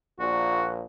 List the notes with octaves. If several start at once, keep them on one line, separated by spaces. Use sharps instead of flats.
A#1 A#2 F#4